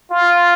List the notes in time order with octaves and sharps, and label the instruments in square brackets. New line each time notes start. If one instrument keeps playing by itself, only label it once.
[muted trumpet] F4